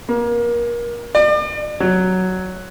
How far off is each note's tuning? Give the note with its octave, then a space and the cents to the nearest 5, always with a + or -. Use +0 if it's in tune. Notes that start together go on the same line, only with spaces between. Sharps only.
A#3 +30
D5 +40
F#3 +5